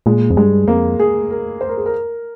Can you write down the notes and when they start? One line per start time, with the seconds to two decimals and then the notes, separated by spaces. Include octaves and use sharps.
0.06 A#2 G#3
0.30 F2
0.37 G2 G#3
0.68 F2 A#3
0.99 G#4
1.30 A#4
1.61 C5
1.69 A#4
1.77 G#4
1.86 A#4